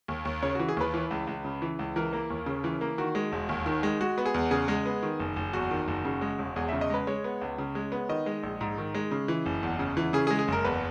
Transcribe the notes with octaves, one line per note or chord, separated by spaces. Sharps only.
D#2
D#2
C#3 C#5
E3 F#4
G#4
D#2 B4
E3
C#2
C#2
C#3
E3
C#2
E3 A#4
A#3
D#2
C#3
E3
A#3
D#3 F#4
G#3
E1
D#2
D#3
G#3
G#3 F#4
B3
G#4
E2
C#3 G#4
G#3
B3
D#3
F#1
F#1
E2 F#4
D#3
F#1
C#3
G#3
E1
E2 G#4
C#3 E5
D#5
G#3 B4
G#3 C#5
B3
C#2
C#3
G#3
B3
D#3 D#5
G#3
A#1
G#2
D#3
G#3
C#3
E3
F#1
E2
C#3
E3
C#3 G#4
G#4
G#3
G#4
F#1 A#4
E2 B4